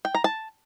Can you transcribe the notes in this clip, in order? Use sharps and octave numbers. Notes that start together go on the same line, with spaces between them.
G5
A#5
A5